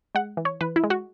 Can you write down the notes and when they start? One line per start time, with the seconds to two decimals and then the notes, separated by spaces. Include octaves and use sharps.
0.15 G#3 F#5
0.37 E3
0.45 C#5
0.61 E3 B4
0.76 E4
0.84 G#3
0.90 F#4